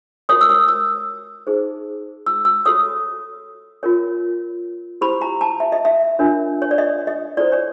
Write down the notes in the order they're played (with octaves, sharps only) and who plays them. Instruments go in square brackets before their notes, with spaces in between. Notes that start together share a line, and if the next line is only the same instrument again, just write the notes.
[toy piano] F#4 A#4 C#5 D#6
E6
D#6
E6
D#4 G#4 C5
E6
E6
F#4 A4 C#5 D#6
F4 A#4 C#5
E4 G4 C5 B5
A#5
A5
E5
D#5
E5
D4 F4 A#4 C#5
C#5
D5
D#5
D#5
E4 A4 C5 D5
C#5